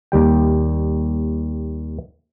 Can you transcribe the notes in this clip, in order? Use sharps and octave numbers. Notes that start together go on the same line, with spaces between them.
D#2 G3 G5